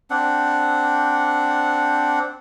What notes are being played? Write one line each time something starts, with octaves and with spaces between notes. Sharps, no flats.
C4 D4 F#5